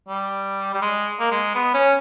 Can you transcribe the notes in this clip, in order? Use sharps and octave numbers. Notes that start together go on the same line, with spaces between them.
G3
G3
G#3
A#3
G#3
B3
C#4